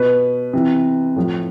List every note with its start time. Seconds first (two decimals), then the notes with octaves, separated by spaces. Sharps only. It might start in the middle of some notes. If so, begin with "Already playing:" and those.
Already playing: B2 B4
0.53 C3 E3
1.16 A2 F3